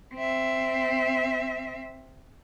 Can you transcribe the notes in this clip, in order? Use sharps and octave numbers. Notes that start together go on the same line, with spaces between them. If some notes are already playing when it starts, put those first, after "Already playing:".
C4 E5